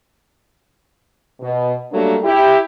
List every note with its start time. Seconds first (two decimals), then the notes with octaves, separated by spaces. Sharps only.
1.41 B2
1.92 F#3 G3 A3 A#3 D4
2.24 E4 G4